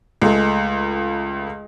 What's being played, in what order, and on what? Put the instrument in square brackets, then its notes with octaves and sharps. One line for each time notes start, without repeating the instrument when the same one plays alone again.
[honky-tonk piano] C#2 A3 [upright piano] G#3